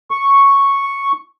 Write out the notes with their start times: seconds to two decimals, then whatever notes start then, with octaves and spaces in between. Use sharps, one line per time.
0.11 C#6